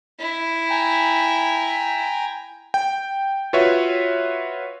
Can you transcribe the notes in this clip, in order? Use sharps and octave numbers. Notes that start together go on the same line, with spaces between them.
E4
G5 G#5 A#5
G5
F4 F#4 B4 C#5 E5